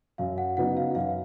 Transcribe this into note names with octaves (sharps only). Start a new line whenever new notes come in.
F#2 F5
F#5
C#3 F#3 B3 D#4 F#5
F5
F#2 F5